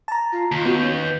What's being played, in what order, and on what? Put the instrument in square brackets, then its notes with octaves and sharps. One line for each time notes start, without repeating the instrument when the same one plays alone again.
[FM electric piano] A5 A#5
[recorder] F4
[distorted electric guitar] D#2 [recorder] F4
[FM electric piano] B3 [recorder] F#4
[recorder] C#4 [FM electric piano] G6
[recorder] B4